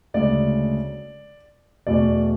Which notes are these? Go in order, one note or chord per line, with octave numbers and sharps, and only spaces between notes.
D2 C#3 G#3 D5
E2 B2 A3 D5